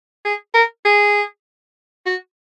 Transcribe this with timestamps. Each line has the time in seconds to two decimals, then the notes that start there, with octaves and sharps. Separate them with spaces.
0.25 G#4
0.54 A#4
0.85 G#4
2.06 F#4